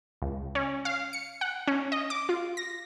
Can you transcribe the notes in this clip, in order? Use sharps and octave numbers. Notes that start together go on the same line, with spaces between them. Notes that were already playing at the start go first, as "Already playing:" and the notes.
C#2
C#4
F5
C#7
F#5
C#4
D#5
D6
F4
A#6